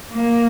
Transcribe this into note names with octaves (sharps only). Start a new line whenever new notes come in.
A#3